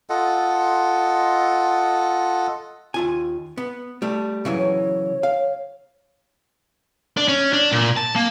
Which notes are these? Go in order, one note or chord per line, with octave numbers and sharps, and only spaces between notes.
F4 A4 D#5 F#5
D#2 F4 G#5
B3
G3 A3
C#3 E3 F#3
C#5
F5
D4
C#4
D4
A#2
A5
A#3